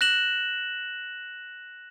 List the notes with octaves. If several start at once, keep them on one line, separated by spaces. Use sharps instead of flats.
F#6 A#6 E7 F#7